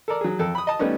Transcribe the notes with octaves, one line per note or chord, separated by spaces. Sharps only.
A4 A#4 D5
F#3 G#4
F2 A4
B5 D#6
D#5 A5
G3 A3 B3 C#4 D#4